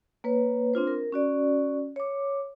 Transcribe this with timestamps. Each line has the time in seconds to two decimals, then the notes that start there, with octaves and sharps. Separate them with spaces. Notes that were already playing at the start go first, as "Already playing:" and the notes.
0.24 A#3 B4 C#5
0.74 C4 D4 F4 C5
0.87 A#4
1.12 C#4 F#4 D5
1.96 C#5 D6